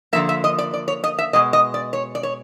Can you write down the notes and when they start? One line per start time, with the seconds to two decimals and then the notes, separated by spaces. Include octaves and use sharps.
0.13 D3 F3 A#3 E5
0.29 E5
0.44 D#5
0.58 D5
0.74 D5
0.88 C#5
1.04 D#5
1.19 E5
1.33 B2 G#3 D#5
1.53 D#5
1.74 D5
1.93 C#5
2.15 D5
2.23 C#5